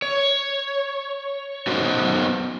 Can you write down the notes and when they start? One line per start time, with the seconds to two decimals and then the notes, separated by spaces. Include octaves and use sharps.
0.02 C#5
1.67 F#3 B3 C#4 D#4 F#4 C5